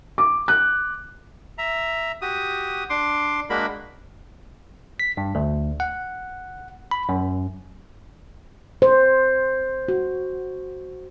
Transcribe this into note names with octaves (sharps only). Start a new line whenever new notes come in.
D6
F#6
E5 A#5
F#4 G4 D#6
D4 C6 D6
G#3 A#3 D4 F#4 A#4 B5
B6
G2
D2
F#5
B5
F#2
C5
F#4